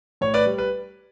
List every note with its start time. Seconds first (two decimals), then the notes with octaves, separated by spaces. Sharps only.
0.21 A2 C#5
0.34 B4 D5
0.46 G3
0.58 B4